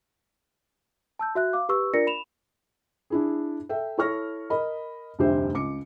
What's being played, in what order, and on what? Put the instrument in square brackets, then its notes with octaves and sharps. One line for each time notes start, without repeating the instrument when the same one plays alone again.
[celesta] A5 E6 G6
F#4 E5 F#6
F5 D6
G4 B4 C#6 E6
D4 F4 A#4 D5 A#6 C#7
B5 E7 F7
[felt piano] D4 E4 G#4
A4 E5 G5
E4 A4 C#5 C#6 F6 A#6
A#4 D#5 B5
F1 D2 G2 G4 C5 E5
C#2 D6 C#7